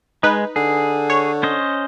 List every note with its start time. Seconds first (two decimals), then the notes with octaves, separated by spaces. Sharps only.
0.23 G#3 D#4 B4
0.56 D3 G#4
1.10 C#5
1.43 C#4 C5 D#5